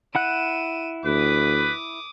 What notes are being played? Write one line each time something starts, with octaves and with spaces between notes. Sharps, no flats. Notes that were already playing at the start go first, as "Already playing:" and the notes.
E4 F#5 F#6 D#7 E7
D2 B4 D6 D#6